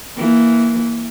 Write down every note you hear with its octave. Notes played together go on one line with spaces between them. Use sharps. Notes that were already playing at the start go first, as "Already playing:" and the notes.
E3 A#3